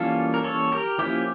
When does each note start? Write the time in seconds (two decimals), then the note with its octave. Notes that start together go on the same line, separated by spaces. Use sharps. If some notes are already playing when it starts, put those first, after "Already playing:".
Already playing: E3 G3 A#3 C#4 F4 A4
0.34 A#4
0.44 A4 C#5
0.72 G4 A#4
0.98 F3 A#3 C#4 E4 G4